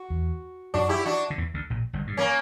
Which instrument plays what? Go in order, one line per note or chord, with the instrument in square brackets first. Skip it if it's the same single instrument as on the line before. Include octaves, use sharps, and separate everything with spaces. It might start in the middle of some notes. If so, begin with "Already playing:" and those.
Already playing: [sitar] F#4
[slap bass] E2
[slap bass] F#2 [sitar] D4 F#4
[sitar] E4 G4
D4 F#4
[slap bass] D3
E2 E3
D2 D3
A#1 A#2
G1 G2
G2
[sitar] A#3 C#4